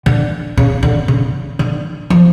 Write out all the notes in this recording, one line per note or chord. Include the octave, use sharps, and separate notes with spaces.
D3
C#3
D3
C#3
D3
F3